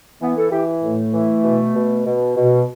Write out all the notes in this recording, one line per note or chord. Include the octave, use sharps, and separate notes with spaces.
E3 B3
A4
E3 G4
A2 A3
E3
B2
B2
B2
B2